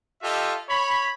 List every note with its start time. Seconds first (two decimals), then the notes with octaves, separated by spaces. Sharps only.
0.22 F4 G4 A4 D#5 E5
0.69 C#5 B5